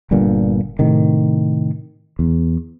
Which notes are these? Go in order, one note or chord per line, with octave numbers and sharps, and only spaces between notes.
G1 G2 A#2 D3
A2 C3 D#3
E2